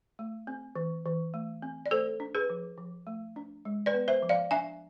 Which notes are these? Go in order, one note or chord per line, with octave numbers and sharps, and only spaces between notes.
A3
C4
E3
E3
A3
C4
D5
A3 A4 C5
D4
G#4 B4
F3
F3
A3
D4
G#3
B4 D5
B3
C5 E5
F3
D5 F5
D4 E5 G#5